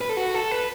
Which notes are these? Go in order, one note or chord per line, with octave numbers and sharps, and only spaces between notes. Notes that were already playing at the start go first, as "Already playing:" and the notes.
B4
A4
F#4
A4
B4